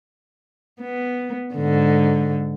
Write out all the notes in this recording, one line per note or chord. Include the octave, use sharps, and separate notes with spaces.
B3
G#2 D3